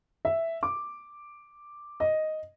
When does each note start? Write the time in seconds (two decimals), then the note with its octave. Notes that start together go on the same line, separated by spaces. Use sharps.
0.25 E5
0.63 D6
2.00 D#5